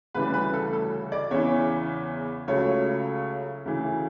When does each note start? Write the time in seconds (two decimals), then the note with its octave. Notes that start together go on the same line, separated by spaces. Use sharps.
0.15 D2 C#3 E3 G3 B4
0.34 B4
0.53 A4
0.73 A4
1.12 D5
1.31 E2 C#3 E3 C#5
2.48 C#2 C#3 F#3 A3 C#5
3.66 D2 C#3 E3